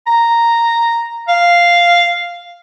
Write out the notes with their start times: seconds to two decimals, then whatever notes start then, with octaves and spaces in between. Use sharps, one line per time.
0.07 A#5
1.28 F5